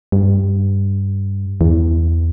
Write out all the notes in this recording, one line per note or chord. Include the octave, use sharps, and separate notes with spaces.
G2
E2